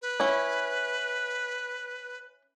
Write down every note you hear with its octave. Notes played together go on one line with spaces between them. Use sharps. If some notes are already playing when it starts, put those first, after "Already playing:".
B4
C#4 E4